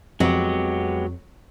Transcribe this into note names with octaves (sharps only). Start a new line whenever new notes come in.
F2 F#3 G#3 B3 G4